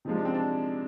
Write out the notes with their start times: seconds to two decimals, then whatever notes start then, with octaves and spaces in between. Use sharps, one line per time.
0.05 C3 F3 G#3 D#4
0.15 D4
0.25 C4
0.34 D4